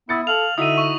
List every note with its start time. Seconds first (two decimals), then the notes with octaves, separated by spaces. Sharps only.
0.09 B3 E4 D#6 A6 C#7
0.27 A4 F5 F7 F#7
0.58 D3 D#4 E4 F#4 E5 D#6 D#7
0.78 C#6